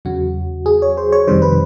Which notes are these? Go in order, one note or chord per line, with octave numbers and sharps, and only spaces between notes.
E2 C#3 F#3 F#4
G#4
C#5
C5
C#5
F2 C3 D#3 G3 C5
B4